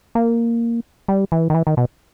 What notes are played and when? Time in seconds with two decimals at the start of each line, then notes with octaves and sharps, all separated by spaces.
0.15 A#3
1.08 G3
1.32 E3
1.50 D#3
1.55 E3
1.67 D#3
1.77 B2